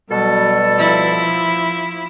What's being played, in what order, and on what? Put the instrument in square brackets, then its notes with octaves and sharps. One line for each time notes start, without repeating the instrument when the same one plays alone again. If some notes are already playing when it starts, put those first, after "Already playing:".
[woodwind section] B2 G3 A4 [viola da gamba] F#3
[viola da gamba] F3 E4